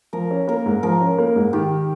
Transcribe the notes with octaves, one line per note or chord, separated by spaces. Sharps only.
F3 A#4
C#4
A#3 A#4
G#2
F3 A#4
C#4
A#3
G#2
D#3 G4